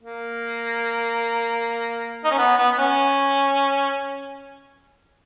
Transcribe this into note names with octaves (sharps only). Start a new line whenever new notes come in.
A#3
D#4
C#4
B3
B3
B3
C#4